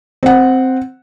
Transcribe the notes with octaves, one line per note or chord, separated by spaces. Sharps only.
C4 F#5